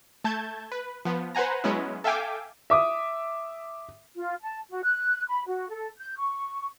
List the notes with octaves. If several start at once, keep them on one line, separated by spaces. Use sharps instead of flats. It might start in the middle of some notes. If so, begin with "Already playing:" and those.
A3 A5 G6 G#6
B4
F3 B3
B4 C5 F#5 G#5 A#5
F#3 G#3 B3 C#4 E4
A4 E5 F5 G5 G#5 D6
E5 D6 D#6
F4
A5
F#4
F#6
B5
F#4
A4
G6
C#6